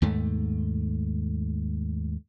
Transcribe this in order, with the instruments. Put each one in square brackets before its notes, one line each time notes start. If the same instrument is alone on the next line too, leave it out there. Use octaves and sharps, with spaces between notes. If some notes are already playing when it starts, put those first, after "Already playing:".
[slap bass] D#2 G#2 A3